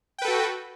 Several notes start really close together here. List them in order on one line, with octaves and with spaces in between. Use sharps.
G5 B4 A4 F#4